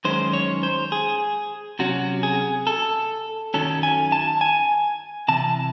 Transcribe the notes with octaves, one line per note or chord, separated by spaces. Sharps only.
F#2 D#3 G#3 C#4 C5
C#5
C5
G#4
C3 F#3 C#4 F#4
G#4
A4
F#2 D#3 F#3 C#4 A4
G#5
A5
G#5
C3 E3 A5